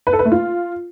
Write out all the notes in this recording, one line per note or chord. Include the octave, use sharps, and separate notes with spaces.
B4
A4
B4
A3
F4